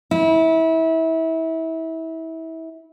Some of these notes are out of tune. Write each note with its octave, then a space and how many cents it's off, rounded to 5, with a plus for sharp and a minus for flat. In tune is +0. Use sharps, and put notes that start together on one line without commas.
E4 -25